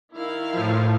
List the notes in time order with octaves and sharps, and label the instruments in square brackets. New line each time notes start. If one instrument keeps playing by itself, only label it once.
[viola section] D#3 E4 F5
[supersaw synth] A2 F3